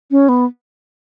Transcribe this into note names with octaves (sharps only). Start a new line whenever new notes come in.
C#4
B3